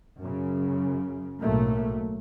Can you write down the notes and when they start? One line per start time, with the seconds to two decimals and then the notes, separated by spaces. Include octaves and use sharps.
0.20 F#2 C#3
1.40 B1 A2 F#3 A3 A#3